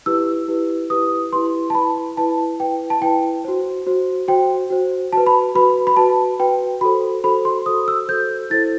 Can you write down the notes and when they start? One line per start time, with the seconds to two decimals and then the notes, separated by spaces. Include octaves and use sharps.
0.06 E4 G4 B4 E6
0.48 E4 G4 B4
0.90 E4 G4 B4 D#6
1.32 E4 G4 B4 C6
1.70 A5
1.74 E4 B4 B5
2.17 E4 B4 A5
2.60 E4 B4 G5
2.90 A5
3.01 E4 B4 G5
3.44 F#4 C5
3.87 F#4 C5
4.28 F#4 C5 G5
4.70 F#4 C5
5.13 F#4 B4 A5
5.27 B5
5.55 F#4 B4 B5
5.87 B5
5.97 F#4 B4 A5
6.39 F#4 B4 G5
6.81 F#4 A4 C5 B5
7.24 F#4 A4 C5 B5
7.45 C6
7.66 F#4 A4 C5 D#6
7.88 E6
8.08 F#4 A4 C5 G6
8.50 E4 A4 C5 A6